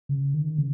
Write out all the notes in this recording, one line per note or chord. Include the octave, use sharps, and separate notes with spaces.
C#3
D#3
C#3